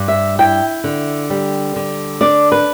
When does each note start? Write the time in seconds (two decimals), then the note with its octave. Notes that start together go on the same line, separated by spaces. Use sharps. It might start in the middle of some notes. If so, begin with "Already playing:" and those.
Already playing: G2
0.08 E5
0.39 E4 G5
0.84 D3
1.30 G3
1.76 D3
2.21 D4 D5
2.52 B4